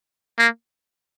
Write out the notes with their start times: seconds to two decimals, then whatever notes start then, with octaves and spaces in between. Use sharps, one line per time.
0.38 A#3